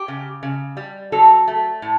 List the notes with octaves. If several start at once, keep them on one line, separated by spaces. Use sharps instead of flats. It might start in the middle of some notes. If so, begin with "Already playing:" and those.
Already playing: G4
C#3
C#3
G3
F#3 A4
A3
A2